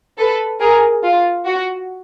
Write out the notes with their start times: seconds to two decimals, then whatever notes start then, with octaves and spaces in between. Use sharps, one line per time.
0.18 A4 B4
0.61 G#4 A#4
1.04 F4
1.46 F#4